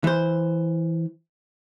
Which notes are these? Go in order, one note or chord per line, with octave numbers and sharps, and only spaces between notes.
E3 C5